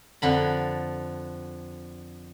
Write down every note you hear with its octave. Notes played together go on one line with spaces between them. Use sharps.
F2 D3 B5